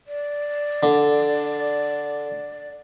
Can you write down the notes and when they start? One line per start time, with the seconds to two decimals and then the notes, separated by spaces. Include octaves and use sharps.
0.07 D5
0.83 D3